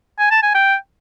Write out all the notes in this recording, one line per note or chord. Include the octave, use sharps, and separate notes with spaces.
G#5
A5
G#5
G5